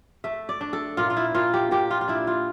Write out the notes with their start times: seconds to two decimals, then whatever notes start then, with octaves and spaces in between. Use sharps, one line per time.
0.24 A3 E5
0.49 D5
0.61 D4
0.73 A4
0.97 A#2 F4
1.10 F4
1.17 E4
1.35 A#2 F4
1.54 G4
1.71 A#2 G4
1.91 F4
2.01 F4
2.08 D4 E4
2.27 F4